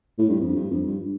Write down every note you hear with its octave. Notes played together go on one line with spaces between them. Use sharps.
A2
G2
F2
G2
F2
G2